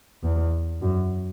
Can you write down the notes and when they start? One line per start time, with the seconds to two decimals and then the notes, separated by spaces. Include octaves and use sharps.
0.23 E2
0.82 F#2